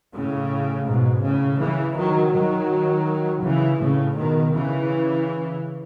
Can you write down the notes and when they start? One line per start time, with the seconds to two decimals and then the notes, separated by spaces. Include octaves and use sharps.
0.14 A2 C#3
0.87 G#2 B2
1.23 A2 C#3
1.60 C#3 E3
1.96 D#3 F#3
2.33 D#3 F#3
3.43 C#3 E3
3.80 A2 C#3
4.16 B2 D#3
4.53 C#3 E3